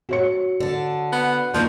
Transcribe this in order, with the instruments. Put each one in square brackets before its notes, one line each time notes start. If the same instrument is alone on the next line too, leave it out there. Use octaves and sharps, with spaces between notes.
[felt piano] F#4 C#5 C#7
[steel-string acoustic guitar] D3 A5
[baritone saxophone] B3
[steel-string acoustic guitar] D#3 A#3 D4 [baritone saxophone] F3